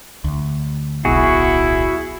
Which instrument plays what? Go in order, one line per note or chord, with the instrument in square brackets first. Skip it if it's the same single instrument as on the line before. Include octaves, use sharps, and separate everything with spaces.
[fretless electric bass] D2
[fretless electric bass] D1 B1 B2 [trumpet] E4 [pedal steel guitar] F#4 G#4